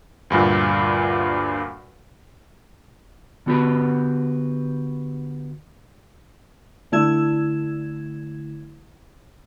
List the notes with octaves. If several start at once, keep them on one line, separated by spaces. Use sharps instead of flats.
D2 G2 A#2
D3 B3 F#4 G4 B4
D3 A3 E4 G#6 E7